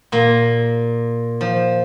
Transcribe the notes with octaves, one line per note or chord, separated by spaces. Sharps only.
A#2 A#3
F3